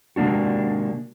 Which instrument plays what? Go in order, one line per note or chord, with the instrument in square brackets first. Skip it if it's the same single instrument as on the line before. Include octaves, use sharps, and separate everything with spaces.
[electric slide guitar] C3 G#3 A#3 D4 F#4